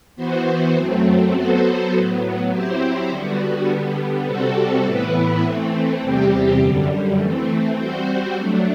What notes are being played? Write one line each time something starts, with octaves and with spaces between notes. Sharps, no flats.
E3 B3 F#4 C5
F#2 F#3 A3 C4
F#3 B3 F#4 A4 C5
A2 F#3 B3
F#3 C4 E4 G4 C5
D3 G3 B3 F#4
D3 G3 B3
C3 G3 C4 F#4 A4
A2 E3 B3 E4 B4
E3 A3 C4
E2 C3 G3 C4 G4
F#2 D3 G3
E3 A3 C4
G3 C4 F#4 C5
F#3 A3 D4